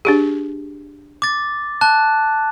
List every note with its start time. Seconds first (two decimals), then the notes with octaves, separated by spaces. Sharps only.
0.05 D4 G4 G#4
1.22 D6 A6
1.81 A5 F#6